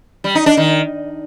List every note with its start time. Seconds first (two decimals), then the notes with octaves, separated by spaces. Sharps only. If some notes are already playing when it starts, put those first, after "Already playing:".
0.24 G3
0.35 D#4
0.46 D4
0.57 D#3